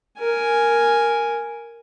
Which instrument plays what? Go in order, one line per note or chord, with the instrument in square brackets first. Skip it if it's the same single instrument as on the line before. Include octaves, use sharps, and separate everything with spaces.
[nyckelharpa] A#4 G#5